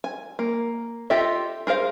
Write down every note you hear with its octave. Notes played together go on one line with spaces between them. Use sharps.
G#5
A#3
F4 G4 A4 D#5 E5
G#4 A#4 C5 F5